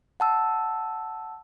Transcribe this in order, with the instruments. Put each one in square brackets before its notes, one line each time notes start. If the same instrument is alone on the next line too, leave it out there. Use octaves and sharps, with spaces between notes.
[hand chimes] F#5 A5 E6